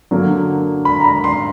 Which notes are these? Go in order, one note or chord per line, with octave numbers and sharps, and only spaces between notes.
D3 F#3 A#3
B5
A#5
B5
C6